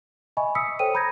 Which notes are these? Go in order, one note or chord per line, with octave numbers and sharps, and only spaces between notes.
D#5 E5 G#5 B5 C#6
D#6 E6 B6 C#7
A4 C5 C#5 G5 D#7
A#5 B5 D#6 G6 G#6 A#6